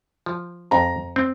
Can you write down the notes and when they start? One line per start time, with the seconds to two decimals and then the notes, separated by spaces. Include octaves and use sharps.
0.26 F3
0.71 F2 A#5
1.16 C4